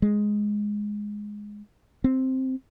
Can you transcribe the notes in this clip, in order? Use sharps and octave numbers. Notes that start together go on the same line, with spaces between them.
G#3
C4